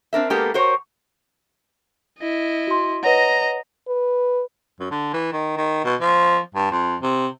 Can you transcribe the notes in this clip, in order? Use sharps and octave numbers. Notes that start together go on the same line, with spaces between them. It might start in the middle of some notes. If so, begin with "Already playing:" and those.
C4 D4 A#4 E5
G#3 A#3 B3 G4 A4 A#4
F#4 A#4 C5 C#5
E4 D#5
F#4 C6
B4 C#5 D#5 F#5 A#5
B4
F#2
D3
E3
D#3
D#3
B2
F3
G2
F2
C3